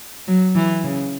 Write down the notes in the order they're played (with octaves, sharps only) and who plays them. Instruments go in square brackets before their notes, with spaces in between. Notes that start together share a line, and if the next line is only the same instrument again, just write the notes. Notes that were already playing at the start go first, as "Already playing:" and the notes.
[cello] F#3
E3
C#3